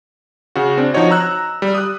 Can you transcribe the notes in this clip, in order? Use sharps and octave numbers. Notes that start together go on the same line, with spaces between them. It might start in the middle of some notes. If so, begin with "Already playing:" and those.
C#3 F#4
C4 D4
F3 D#4 F#4 C#5 D#5
A#5 E6 F#6
G3
D#6 F#6